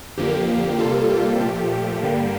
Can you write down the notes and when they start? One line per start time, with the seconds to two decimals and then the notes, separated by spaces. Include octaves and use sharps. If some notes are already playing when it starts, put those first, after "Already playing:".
0.18 F2 D3 F3 A#3 G4
0.79 C3 G3 A#3 F4 A4
1.10 G4
1.41 A#2 F3 A3 G4
1.72 G4
2.02 G2 D3 G3 A#3